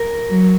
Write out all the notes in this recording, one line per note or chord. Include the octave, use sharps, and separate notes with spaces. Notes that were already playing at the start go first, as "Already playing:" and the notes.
Already playing: A#4
F#3